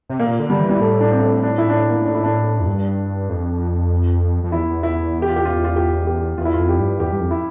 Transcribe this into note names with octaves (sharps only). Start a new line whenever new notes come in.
C3
A#2 A#3
D3
G3
E3
G3
A2 A3
D4
C4
D4
E4
D4
E4
A#3
D4
E4
D4
F2
G2
F2
F2
E2 E4
E4
G4
F4
G4
F4
F4
G4
G4
E2 F4
E4
F2 F4
G4
G2
E2 G4
G2
F2
E4